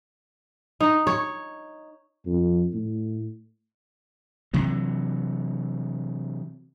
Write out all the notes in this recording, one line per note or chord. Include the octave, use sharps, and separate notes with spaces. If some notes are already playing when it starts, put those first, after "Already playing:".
D#4
C#5
F2
A2
C3 E3 F#3